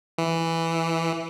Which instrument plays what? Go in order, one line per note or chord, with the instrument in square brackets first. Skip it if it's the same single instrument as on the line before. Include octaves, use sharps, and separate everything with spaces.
[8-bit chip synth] E3